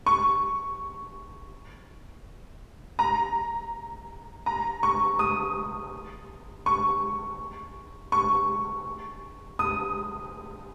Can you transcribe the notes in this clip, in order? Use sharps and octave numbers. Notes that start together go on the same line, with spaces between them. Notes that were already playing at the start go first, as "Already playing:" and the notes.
C#6
A#5
A#5
C#6
D#6
C#6
C#6
D#6